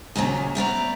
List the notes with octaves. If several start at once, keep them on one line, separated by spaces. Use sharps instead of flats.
D#2 A#2 C#3 F#3
A3 B3 D5 A#5